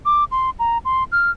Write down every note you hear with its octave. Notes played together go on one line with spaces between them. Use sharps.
D6
C6
A#5
C6
F6